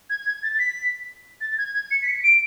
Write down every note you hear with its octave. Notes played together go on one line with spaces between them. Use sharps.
G#6
G#6
A6
B6
A6
G#6
G#6
C#7
B6
C#7
D7